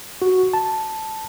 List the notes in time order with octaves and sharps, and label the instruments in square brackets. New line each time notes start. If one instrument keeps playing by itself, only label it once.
[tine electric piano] F#4
A5